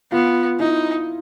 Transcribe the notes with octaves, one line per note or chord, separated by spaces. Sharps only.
B3 F4
D#4 E4